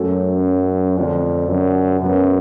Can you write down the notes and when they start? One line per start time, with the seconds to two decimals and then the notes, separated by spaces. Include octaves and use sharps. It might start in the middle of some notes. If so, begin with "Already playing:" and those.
Already playing: F#2 F#3 A3 C#4 F#4 A4
0.97 F2 D3 F3 A3 D4
1.49 F#2
2.01 F#2 C#3 F#3 B3